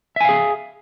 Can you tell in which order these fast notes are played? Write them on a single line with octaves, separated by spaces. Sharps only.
E5 G#5 F5 G#4